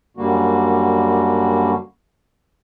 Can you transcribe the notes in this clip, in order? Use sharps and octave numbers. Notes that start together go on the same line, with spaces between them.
F#2 D3 G3 A#3 F#4